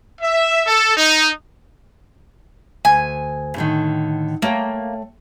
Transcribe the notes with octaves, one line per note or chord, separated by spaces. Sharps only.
E5
A4
D#4
D2 G#5
A2 D3 D#3
A3 A#3 C#5 G5